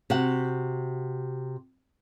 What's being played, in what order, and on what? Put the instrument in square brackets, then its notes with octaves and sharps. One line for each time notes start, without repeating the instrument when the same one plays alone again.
[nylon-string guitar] C3 F#4 F#5